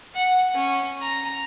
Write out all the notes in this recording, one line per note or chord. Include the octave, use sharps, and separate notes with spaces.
F#5
C#4
A#5